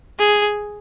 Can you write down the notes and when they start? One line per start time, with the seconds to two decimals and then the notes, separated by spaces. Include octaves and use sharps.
0.19 G#4